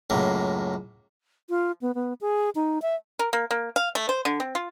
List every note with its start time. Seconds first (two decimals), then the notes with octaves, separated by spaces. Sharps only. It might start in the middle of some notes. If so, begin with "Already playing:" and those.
0.10 C#2 F#2 A2 A#3
1.50 F4
1.82 B3
1.95 B3
2.21 G#4
2.55 D#4
2.82 E5
3.19 A#4
3.33 A#3
3.51 A#3
3.76 F5
3.95 A3
4.09 C5
4.25 D3
4.40 C4
4.55 F4